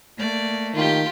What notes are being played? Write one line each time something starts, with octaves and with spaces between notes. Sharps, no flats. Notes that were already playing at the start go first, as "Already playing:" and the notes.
A3 A#3 D5
D#3 F4 G4